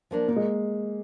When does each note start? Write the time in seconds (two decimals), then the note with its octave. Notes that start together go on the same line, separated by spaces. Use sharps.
0.11 F3 A#3 D4
0.28 A#2 A#3
0.36 G#3